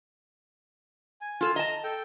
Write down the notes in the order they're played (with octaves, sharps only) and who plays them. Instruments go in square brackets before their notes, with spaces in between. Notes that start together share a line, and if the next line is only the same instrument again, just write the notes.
[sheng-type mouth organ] G#5
[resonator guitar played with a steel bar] F4 A4
[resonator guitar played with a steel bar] D#5 A5 [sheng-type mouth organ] A#5
[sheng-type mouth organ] A4 G5